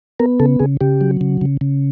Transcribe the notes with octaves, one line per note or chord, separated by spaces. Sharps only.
B3 A#4
C#3 A4
C#3 G#4
C#3 G4
F#3
C#3
C#3
C#3